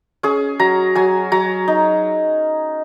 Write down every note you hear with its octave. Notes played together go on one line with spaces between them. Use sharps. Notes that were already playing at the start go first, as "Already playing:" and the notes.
C#4 G#4
F#3 A#5
F#3 G#5
F#3 A#5
D#4